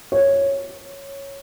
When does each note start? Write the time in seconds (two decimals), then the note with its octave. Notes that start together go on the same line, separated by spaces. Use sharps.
0.12 C#5